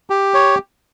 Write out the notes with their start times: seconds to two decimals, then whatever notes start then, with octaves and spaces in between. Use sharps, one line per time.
0.10 G4
0.34 C#5